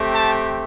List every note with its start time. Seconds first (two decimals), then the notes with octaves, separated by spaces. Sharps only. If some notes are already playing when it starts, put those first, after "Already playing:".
Already playing: A3 C4 G4
0.14 A5